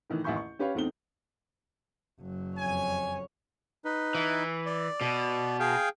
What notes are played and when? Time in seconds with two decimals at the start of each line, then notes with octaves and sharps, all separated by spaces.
0.10 A2 D#3 E3
0.24 A1 D#2 E5 G#5 C#6 G6
0.36 C#6
0.59 C#4 G4 B4 C#5 F5
0.75 E2 A3 C4 D#4 G7
2.21 F#1 F#3
2.57 F2 C#5 G#5
3.85 D#4 B4
4.15 E3
4.66 D5
5.01 B2
5.60 G#4 F5 G5